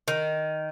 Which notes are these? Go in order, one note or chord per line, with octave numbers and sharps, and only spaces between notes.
D#3